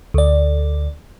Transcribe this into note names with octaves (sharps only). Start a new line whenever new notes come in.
D2 D5